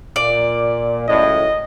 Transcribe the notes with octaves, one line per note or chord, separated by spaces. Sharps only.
A#2 D5
C#2 F#2 A2 D#5